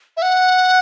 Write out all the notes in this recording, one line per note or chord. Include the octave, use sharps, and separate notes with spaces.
E5
F#5